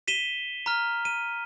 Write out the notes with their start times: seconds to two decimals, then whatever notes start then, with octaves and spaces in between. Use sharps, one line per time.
0.08 B6 D#7 E7 G7
0.66 A#5 F6
1.05 D#7